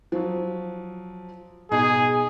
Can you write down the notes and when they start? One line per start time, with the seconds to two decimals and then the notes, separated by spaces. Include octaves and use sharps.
0.12 F3 F#3
1.71 B2 D#4 G#4